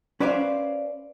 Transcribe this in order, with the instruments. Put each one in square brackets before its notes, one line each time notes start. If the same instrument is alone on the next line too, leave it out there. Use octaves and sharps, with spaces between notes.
[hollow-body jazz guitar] C#4 B4 C5 D5 E5 F5